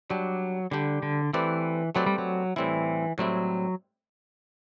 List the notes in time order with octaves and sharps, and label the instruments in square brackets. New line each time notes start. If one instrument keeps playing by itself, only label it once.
[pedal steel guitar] F#3 [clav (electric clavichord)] G3 D4 G4
[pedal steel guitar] D3 [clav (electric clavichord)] G3 D4 G4
[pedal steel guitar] D3
[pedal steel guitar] E3 [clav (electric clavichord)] A3 C4 G4 B4 D5
[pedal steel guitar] F#3 [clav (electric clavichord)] A3 C4 G4 B4 D5
[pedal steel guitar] G3
F#3
[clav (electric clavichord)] A2 G3 C4 E4 [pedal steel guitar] E3
[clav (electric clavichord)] A2 G3 C4 E4 [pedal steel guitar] F#3